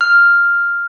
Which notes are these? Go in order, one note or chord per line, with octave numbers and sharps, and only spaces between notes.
F6